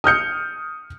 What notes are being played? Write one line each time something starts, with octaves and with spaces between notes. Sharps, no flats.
D#6 F6 G6 C#7